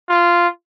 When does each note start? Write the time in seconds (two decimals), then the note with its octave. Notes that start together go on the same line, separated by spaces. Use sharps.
0.09 F4